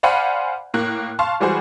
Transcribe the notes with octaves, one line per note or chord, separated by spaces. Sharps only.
C5 D5 F5 F#5 G#5 B5
A2 A#3 F#6
F5 A5 C6 C#6
E3 G3 G#3 F#4 G#4 C5